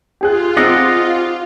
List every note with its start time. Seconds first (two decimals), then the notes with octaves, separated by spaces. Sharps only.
0.21 F4 G4 G#4 F#6
0.57 C4 D#4 D5 D#5 F#5